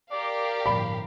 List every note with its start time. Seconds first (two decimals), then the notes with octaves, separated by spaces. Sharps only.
0.11 G4 A#4 D5 F5
0.66 G1 A2 F3 B5